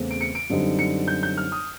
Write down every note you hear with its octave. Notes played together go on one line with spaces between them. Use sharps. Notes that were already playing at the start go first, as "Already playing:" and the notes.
Already playing: E2 C#3 E3 A3 C4
D7
C#7
D7
F#2 D3 G3 C4 D#4
C#7
G6
G6
F6
D#6